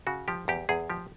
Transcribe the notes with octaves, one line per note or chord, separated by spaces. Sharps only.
C#3 F#4
F3 G4
E2 G4
E2 G#4
F3 G4